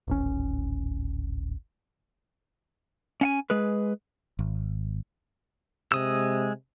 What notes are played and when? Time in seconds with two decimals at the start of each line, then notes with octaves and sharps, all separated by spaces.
0.08 D1 G#1 C#4
3.21 C#4 F#5 G#5
3.50 G#3 G#4 B4
4.39 G#1
5.92 C3 G#3 D#6 E6